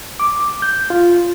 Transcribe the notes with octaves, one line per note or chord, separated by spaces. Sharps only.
D6
G6
F4